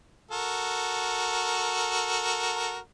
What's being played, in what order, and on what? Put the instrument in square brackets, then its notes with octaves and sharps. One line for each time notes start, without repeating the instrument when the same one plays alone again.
[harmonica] F#4 A4 A#4